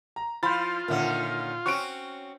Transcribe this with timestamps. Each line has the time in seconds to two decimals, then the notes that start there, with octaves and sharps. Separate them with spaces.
0.16 A#5
0.43 F3 E4 F4 B5 C6 G6 A6
0.88 A#2 D3 D#3 C#4 A#4 E5 F#5
1.66 C4 C#4 F#4 C#6 F#6 D7